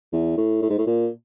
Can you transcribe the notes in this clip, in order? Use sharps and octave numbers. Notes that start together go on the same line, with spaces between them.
E2
A2
A2
G#2
A2
A#2